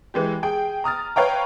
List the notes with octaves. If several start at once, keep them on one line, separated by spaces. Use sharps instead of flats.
E3 G#3 G4
G#4 G5
A#5 D#6 F6 A6
B4 C#5 F5 G5 A#5